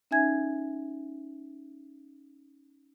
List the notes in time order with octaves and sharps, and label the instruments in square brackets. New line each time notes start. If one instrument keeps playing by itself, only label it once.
[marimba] C#4 D#4 E5 G#5 G#6